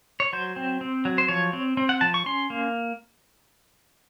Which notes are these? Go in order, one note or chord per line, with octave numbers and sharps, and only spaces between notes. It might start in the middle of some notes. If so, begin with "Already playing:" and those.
C#5
F#3 C5
C4
C4
F#3
C5
F3 C#5
C4
C4
F#5
F3 A5
C#6
C#4 C6
A#3